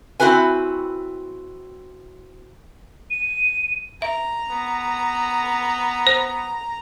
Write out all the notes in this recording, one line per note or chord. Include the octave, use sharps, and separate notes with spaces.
C4 E4 F#4 B4 G#5
D#7
E5 A#5
B3
C5